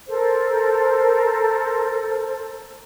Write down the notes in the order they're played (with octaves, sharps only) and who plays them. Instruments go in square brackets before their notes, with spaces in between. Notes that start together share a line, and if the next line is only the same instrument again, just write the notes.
[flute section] A4 A#4 C5